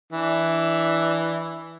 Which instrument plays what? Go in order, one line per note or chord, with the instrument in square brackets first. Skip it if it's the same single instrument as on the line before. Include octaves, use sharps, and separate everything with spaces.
[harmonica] E3 D4 E5